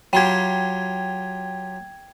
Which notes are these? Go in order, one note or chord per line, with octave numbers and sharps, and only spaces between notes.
F#3 F4 G4 G5 G#6